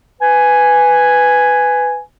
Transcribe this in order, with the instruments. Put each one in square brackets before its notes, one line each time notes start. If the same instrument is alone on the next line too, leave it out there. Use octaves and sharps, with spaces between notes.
[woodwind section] B4 G#5